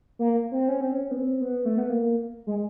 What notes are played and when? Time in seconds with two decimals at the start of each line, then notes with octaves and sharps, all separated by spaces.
0.19 A#3
0.52 C4
0.68 C#4
0.81 C4
0.92 C#4
1.11 B3
1.17 C4
1.41 B3
1.65 A3
1.78 B3
1.90 A#3
2.47 G#3